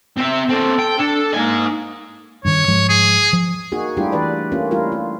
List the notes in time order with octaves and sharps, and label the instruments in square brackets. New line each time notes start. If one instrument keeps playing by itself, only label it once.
[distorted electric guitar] C4 E5
[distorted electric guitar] C4 D4 [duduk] A4
[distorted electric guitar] G5
[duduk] D4 [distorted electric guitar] A4
[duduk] A#3 [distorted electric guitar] D#4 G#5
[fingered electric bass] G2 D#3 [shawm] C#5
[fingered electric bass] G#2 F3 G#3
[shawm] G#4
[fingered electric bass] F3
[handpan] A#3 D#4 F#4 G#4
G3 A3 D4 E4 F4 G4
E3 G4 B4 D5
A3 A#3 C#4 F4 G4
G3 E4 F4 A#4
F4